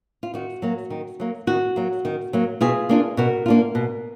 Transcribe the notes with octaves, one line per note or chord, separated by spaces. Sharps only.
F4
D#3 F#4
F#3 A#3
D#3
F#3 A#3
D#3 F#4
F#3 A#3
D#3
F#3 A#3
B2 F4 G#4
A#3 D4 F4
B2 F#4 A#4
A#3 D4 F4
B2